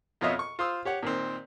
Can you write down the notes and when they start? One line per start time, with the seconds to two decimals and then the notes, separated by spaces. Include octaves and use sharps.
0.21 F2 B2 F4 C#5 D#5 E5
0.39 C#6
0.59 F4 C5 C6 D#6 E6
0.85 G4 C#5 F#5
1.03 A#2 D#3 C4